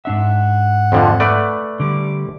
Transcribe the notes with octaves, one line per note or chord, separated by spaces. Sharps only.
G#2 D4 E5 F#5
F2 D3 F3
A3 B4 D5
D3 G3 D6